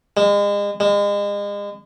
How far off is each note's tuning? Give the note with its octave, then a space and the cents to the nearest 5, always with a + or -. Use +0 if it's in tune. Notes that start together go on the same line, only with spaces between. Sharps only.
G#3 -35
G#3 -35